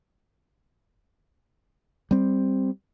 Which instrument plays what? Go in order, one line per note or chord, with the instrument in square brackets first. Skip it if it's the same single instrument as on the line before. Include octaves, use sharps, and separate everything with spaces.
[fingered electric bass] G3 C4